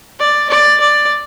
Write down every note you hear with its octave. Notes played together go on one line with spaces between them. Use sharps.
D5
D5
D5